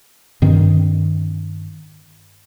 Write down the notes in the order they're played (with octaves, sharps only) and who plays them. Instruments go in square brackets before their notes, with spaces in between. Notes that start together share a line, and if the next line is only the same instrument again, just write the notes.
[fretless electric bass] G2 D#3 C4